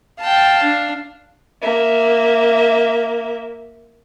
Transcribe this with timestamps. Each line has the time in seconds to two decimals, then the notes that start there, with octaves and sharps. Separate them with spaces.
0.21 F5 G5 A5
0.63 D4
1.62 A#3 E5